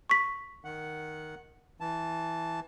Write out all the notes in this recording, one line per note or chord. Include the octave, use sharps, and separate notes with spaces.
C#6 B6
D#3 F#5
E3 A5